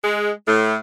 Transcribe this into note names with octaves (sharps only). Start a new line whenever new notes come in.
G#3
A2